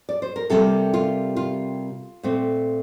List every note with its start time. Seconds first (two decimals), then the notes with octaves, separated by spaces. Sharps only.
0.09 D5
0.22 C5
0.36 A#4
0.50 C3 G3 A#3 A4
0.94 F4
1.36 F4
2.23 A#2 A3 C4